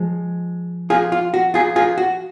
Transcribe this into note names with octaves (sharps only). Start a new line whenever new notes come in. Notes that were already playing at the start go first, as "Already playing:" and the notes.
Already playing: F3 G#3
F4 G#4
F4
F#4
F4 G#4
F4 G#4
F#4